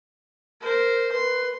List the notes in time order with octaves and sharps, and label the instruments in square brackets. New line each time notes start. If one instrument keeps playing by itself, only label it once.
[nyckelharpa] A#4 C5
[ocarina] B4 [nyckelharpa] C6